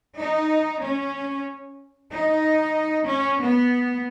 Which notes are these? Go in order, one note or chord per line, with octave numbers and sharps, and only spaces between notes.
D#4
C#4
D#4
C#4
B3